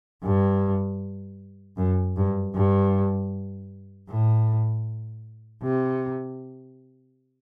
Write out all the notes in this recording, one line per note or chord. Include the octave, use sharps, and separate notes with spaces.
G2
F#2
G2
G2
A2
C3